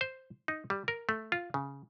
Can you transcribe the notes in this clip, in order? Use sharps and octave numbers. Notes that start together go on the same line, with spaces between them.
C5
D#4
G3
A#4
A3
F4
C#3